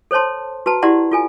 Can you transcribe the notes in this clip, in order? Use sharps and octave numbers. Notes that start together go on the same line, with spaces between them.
A4 C5 C#5 A5 C6
F#4 B4 A5 A#5
E4 G4 D5 F#5 A#5 C6
F4 A4 G#5